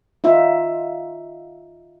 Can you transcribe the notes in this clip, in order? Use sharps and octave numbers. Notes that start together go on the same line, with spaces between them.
D#4 F4 E5